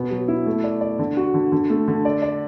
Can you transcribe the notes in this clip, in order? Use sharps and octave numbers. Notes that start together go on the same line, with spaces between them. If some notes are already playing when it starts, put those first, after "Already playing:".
Already playing: B2 B3
F#3
E4
A3
D5
D5
D3
F#4
D3
D3
A3
D3
D5
D5